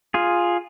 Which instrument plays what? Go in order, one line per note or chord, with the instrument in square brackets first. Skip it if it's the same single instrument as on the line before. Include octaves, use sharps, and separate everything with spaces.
[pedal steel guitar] F4 G#4